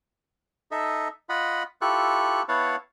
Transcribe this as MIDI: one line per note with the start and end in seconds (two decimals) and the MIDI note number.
0.71 1.08 63
0.71 1.08 69
0.71 1.08 75
0.71 1.08 76
1.29 1.63 65
1.29 1.63 75
1.29 1.63 78
1.29 1.63 83
1.82 2.43 64
1.82 2.43 65
1.82 2.43 67
1.82 2.43 69
1.82 2.43 85
1.82 2.43 90
2.48 2.76 59
2.48 2.76 64
2.48 2.76 73
2.48 2.76 77
2.48 2.76 78
2.48 2.76 81